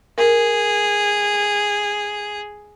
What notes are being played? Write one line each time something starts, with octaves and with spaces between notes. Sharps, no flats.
G#4 A#4